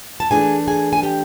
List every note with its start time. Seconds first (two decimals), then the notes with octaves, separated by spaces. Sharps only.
0.20 A5
0.31 E3 A3 D4 G#4 G#5
0.67 G#4 G#5
0.93 G#5
1.03 G4 G5